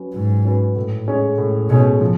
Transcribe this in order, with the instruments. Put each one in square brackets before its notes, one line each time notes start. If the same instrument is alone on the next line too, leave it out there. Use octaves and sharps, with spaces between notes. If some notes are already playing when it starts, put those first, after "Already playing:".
Already playing: [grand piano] F#3 C#4 F#4 B4
[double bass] G#2 [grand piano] F#3
[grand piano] C#4 F#4 B4
A2
G#3 C#4 G#4 C#5
A2
[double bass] B2 [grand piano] G#3 C#4 G#4 C#5
[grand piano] F3